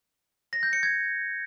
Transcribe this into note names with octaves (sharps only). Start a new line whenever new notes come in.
A#6
G6
C#7
G#6